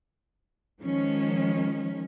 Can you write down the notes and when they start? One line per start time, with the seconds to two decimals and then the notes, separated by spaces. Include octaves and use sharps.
0.80 D#3 F3 G#3 C#4